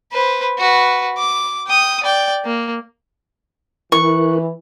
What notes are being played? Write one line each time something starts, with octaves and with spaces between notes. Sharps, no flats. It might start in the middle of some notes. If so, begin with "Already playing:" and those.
B4 C5
F#4 B4
D6
G5 D#6
D5 G5
A#3
E3 E4 A#4 C#6 F#6